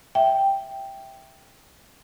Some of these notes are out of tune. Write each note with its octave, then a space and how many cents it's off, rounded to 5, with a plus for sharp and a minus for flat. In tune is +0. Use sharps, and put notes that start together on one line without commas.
E5 +0 G5 +0